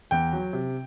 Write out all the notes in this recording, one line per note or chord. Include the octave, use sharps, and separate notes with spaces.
E2 G5
F#3
C3